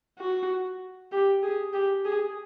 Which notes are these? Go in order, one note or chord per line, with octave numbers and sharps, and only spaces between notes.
F#4
G4
G#4
G4
G#4